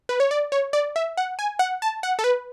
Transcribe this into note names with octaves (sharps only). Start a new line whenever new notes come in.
B4
C#5
D5
C#5
D5
E5
F#5
G#5
F#5
A5
F#5
A4
B4